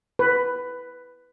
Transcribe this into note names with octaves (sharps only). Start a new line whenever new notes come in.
B4